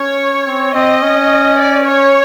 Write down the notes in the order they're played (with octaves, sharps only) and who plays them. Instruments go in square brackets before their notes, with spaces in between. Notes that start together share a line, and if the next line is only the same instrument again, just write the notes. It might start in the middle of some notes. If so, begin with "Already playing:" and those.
Already playing: [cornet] C#4 [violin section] C#5
[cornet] C4
[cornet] C4 [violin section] D#5
[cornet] C#4
[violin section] D5
C#5